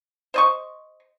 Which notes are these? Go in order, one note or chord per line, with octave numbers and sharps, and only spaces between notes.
C5 D#5 C#6